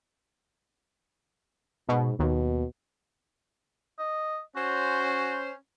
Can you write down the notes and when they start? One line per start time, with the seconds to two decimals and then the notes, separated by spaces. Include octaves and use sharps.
1.89 G#2 B2
2.19 D#2 B2
3.99 D#5
4.56 C#4 F#4 C5